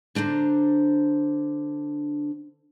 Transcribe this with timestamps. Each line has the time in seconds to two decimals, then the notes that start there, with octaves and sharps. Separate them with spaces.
0.15 D3 D4 C5 A5 A#5